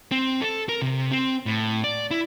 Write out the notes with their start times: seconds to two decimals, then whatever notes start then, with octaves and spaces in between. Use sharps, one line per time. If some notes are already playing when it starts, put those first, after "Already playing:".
0.11 C4
0.42 A4
0.69 A#4
0.82 C3
1.11 C4
1.46 A2
1.84 D5
2.11 E4